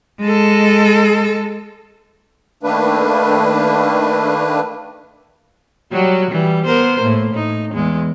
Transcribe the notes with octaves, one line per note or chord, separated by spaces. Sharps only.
G#3 A4
D#3 A3 A#3 D4 B4
F#3 G3 F#4
E3 G3
B3 A#4 C5
A2 A#3
A2 D#4
E2 G#3